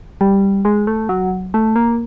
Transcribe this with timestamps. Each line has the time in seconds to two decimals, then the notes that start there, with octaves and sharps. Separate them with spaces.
0.21 G3
0.65 G#3
0.87 A3
1.09 F#3
1.54 A3
1.76 A#3